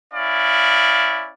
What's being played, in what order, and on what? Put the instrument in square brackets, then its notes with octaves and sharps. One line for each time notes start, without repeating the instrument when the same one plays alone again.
[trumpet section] C#4 E4 D5 F5